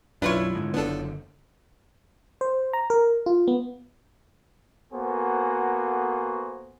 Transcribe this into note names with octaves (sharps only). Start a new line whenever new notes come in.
B1 F#2 D4 E4 F4 B4 C#5
G#2 D3
F#1 D3 B3 D4 A4
C5
A#5
A#4
F4
B3
A#3 B3 F#4 A4 C5 G#5